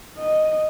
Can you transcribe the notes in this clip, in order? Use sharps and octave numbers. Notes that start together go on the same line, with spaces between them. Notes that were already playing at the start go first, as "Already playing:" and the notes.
D#5